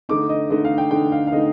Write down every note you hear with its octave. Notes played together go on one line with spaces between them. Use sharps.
D3 A3 D#4 D6
D#5
D3 A3 D#4 D#5
F5
G5
D3 A3 D#4 G5
F5
F5
D3 A3 D#4 D#5